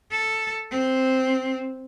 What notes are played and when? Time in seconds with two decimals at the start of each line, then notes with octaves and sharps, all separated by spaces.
0.11 A4
0.71 C4